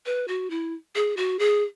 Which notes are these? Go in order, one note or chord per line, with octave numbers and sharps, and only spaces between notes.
B4
F#4
E4
G#4
F#4
G#4